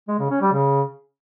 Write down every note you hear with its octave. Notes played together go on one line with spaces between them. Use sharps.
G#3
C#3
C#4
G3
C#3